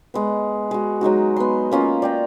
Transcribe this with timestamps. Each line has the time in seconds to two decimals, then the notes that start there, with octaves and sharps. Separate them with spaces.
0.14 G#3 B3
0.71 G#3 F#4
1.01 F#3 G#3 D#4 F#4
1.36 B3 C6
1.71 A#3 C#4 F4
2.02 D5 G5 A#5